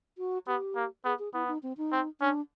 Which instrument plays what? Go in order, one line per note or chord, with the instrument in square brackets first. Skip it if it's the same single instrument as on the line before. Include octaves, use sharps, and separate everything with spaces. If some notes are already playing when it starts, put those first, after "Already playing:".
[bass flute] F#4
[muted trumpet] B3 [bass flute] G4
[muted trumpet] A#3
[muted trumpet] B3 [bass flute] G#4
[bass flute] G#4
[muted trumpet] B3 [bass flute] E4
[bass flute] D#4
C4
D#4
[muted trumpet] C4
[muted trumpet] C#4 [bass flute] D4